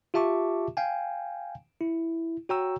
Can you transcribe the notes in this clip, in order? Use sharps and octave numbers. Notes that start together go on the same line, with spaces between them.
F4 G4 E5 A5 C#6 D6
F5 G5 G#5
E4
F#4 C#5 G5 A#5 C#6 E6